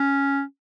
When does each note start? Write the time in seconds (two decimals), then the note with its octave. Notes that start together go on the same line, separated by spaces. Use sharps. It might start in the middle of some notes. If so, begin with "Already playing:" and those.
Already playing: C#4